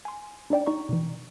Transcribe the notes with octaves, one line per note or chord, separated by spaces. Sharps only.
G#5 C6
D4 D#4 D5 G5
D#4 D5 A#5 C#6
B2 E3